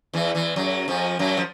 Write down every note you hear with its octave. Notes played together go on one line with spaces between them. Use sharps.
E2 E3
E2 E3
F#2 F#3
F2 F3
F#2 F#3
F3